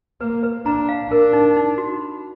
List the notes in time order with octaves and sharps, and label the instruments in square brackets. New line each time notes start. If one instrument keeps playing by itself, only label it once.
[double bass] A#3 [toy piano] B4
[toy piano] B4
[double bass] D4 [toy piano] A#5
[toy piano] F5
[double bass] D4 [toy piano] A#4
[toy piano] D#4
D#4
F#4
B5